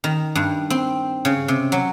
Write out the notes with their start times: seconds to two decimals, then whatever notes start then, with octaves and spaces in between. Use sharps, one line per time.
0.04 D#3
0.35 G2
0.70 C4
1.25 C#3
1.48 C3
1.72 F#3